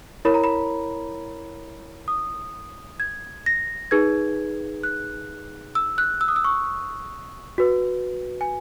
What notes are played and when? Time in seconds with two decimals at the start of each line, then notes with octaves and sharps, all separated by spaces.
0.25 E4 A#4 C#5 B5
0.34 A#5
0.44 B5
2.08 D#6
3.00 G#6
3.46 A#6
3.91 D#4 G#4 B4 G#6
4.83 F#6
5.75 E6
5.98 F#6
6.21 E6
6.28 D#6
6.36 E6
6.44 C#6
7.58 F#4 B4
8.41 G#5